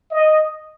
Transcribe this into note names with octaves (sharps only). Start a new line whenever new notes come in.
D#5